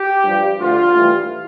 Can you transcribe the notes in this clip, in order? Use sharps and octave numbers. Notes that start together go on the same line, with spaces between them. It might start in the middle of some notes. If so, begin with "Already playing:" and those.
Already playing: G4
G2 F3
D2 D3 F3 F4
A2 E3 G3